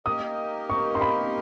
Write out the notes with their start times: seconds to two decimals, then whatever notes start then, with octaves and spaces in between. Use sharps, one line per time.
0.06 A#3 D#4 G4 A#4 D#5 D#6
0.70 C#6
0.95 C6
1.01 B5